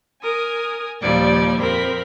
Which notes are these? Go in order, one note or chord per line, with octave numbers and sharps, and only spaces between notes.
A#4 G#5 D#6
D#2 A#2 F3 G3 D5 G#6
F2 C4 A#4 C5 B5